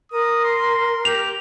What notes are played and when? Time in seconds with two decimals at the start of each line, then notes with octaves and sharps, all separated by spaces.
0.11 A#4 D#6
0.44 C6
1.05 G4 F7